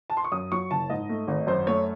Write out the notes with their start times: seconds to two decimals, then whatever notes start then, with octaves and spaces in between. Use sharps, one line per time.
0.10 A5
0.17 C6
0.24 C#6
0.32 F#2 D#6
0.52 F#3 C#6
0.71 F#1 A5
0.90 G#2 D#5
1.09 A3
1.28 G#1
1.47 F#2 C5
1.67 A3 C#5